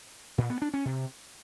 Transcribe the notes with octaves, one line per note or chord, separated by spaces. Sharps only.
A#2
B3
D4
C#4
C3